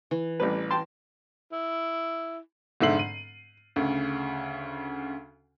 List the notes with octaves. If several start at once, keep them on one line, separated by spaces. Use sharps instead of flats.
E3
A1 G3 B4
G5 A5 C6
E4
F1 G#2 D3 E5 C7 F#7
D#7
D2 C#3